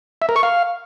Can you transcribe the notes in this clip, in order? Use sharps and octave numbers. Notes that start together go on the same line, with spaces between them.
E5
A#4
C#6
F5